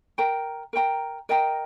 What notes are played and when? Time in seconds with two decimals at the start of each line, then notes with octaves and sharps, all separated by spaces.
0.18 A#4 G5 A#5
0.73 A#4 G5 A#5
1.29 A#4 D#5 G5 A#5